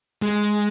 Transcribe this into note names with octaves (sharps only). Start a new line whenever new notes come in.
G#3